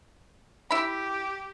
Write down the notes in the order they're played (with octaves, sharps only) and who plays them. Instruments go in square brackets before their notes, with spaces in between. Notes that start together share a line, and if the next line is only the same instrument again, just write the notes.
[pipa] E4 B5 [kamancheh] G4